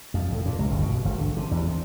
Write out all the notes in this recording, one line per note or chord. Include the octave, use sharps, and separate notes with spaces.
F2
A2
A#2
C#2
G1
B2
G#1
D3
C3
E2
C3